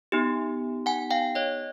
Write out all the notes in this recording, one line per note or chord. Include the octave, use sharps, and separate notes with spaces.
B3 D#4 G4
F#5 G#5
F5 G5
C#5 D#5